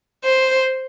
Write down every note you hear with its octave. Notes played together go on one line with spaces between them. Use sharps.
C5